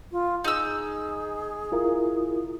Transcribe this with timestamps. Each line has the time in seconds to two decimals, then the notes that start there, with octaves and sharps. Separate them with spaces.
0.12 F4
0.44 D#4 G#4 E6
1.72 E4 F4 A#4